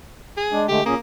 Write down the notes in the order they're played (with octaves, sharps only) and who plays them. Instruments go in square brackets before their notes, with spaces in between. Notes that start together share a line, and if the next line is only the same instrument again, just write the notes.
[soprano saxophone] G#4
[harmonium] G#3 D4
[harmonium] D3 G#3 A3 [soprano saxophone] G4
[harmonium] A#2 C#4 G#4 [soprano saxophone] A#3